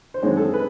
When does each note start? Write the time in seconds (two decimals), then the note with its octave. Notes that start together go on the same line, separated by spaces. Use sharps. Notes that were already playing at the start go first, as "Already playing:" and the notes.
0.14 C5
0.22 F#2 D#3 G#3 C4 C#5
0.37 A4
0.42 G#4
0.53 B4